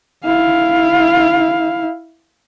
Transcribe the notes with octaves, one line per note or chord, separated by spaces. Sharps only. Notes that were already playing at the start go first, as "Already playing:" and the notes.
E4 F5